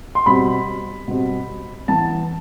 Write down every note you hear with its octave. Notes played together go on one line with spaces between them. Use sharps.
C6
B2 G3 C4 B5
B2 G3 C4
E3 B3 A5